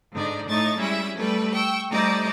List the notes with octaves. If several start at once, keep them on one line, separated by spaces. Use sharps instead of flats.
G#2 D3 D#4 D5
A2 A3 D#4 C#6 A6
G3 G#3 C#4 E4 E5
G3 A3 A4 B4
G5 C#6 E6
G3 A3 D#4 C5 D5 D#5